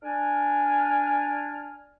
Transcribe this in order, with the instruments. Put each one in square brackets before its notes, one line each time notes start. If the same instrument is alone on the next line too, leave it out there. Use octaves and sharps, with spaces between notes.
[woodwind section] D4 G#5 F6